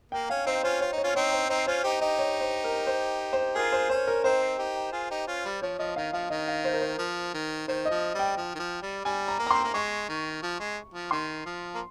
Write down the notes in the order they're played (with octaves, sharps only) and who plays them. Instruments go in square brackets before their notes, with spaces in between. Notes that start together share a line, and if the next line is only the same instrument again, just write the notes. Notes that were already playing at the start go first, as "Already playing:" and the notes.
[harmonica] A#3 [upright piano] G5
[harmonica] C#4 [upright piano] F5
[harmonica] C4 D#4 [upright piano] C5
[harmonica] C#4 F4 [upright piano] C5
[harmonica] F4 [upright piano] C#5
[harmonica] D#4
[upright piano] C#5
[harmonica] C#4 F4
[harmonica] C4 D#4 [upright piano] C#5
[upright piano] C5
[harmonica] C4 D#4 [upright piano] C5
[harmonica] C#4 F4 [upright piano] C5
[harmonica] D#4 G4 [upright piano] C5
[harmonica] D#4 G4 [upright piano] D#5
[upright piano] C#5
C5
A#4
C5
C5
[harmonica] F4 G#4 [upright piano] A#4
[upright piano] C5
[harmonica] C#4 [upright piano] C5
[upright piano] A#4
[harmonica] C4 D#4 [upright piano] C5
[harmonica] D#4 G4
F4 G#4
D#4 G4
C#4 F4
G3
[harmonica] F3 [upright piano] C#5
[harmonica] F3 [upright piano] D#5
[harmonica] D#3 [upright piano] F5
[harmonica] F3 [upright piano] F5
[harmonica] D#3 [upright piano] D#5
[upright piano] F5
C5
A#4
C5
[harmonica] F3
D#3
[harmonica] D#3 [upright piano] C5
[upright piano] D#5
[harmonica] F3
G3
[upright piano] G5
[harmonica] F3
D#3
F3
G3
[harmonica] G3 [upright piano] G#5
[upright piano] A#5
[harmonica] A#3
[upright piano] A#5
[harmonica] C4 [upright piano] C6
[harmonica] A#3
[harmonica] G#3 [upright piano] C#6
[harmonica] D#3
F3
G#3
F3
[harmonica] D#3 [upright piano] C6
[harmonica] F3
A#3